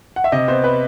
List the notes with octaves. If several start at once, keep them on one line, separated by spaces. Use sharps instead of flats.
F#5
E5
C3 D#5
B3 C5
B4